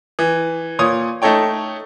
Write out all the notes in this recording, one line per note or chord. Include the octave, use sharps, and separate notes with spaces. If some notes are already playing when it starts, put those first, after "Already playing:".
E3
A#2 C#5 D#6
A3 D#4 A4 C#5 G5